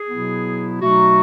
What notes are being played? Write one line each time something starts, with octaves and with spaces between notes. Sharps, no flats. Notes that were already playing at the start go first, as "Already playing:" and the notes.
Already playing: G#4
B2 F#3 B3 E4
B2 F#3 A3 D#4 F#4